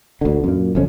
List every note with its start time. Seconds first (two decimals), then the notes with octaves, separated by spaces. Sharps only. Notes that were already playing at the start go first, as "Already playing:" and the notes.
0.21 D2 D3
0.44 F#2 A#2
0.75 F#1 F2 C#4